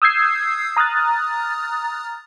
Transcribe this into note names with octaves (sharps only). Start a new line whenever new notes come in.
D#6 E6 G6 G#6 C7
A#5 D#6 F6 F#6 A6